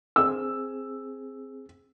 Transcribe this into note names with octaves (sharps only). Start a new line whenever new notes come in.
C4 G#4 E6